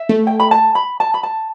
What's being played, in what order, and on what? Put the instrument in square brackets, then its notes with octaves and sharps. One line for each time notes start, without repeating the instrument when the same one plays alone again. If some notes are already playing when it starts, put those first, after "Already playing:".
Already playing: [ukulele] E5
[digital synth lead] A3
[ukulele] G5
B5
A5
B5
A5
B5
A5